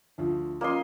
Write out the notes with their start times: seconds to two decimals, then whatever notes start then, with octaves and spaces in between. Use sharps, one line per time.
0.18 D2 F3
0.61 F3 A#3 C#4 D#5 C6